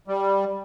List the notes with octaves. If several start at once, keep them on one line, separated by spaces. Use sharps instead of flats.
G3